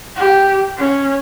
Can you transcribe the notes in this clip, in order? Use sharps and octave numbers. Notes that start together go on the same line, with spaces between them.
G4
C#4